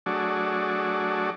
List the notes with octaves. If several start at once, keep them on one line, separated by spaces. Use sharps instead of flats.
F#3 A3 D4 F#4 G#4 D5